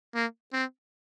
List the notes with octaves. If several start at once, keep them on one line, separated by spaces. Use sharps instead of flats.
A#3
C4